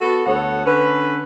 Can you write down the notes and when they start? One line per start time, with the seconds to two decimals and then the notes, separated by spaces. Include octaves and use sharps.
0.01 B3 F#4 A4
0.26 D2 B3 A4 C#5 F#5
0.66 D3 C#4 B4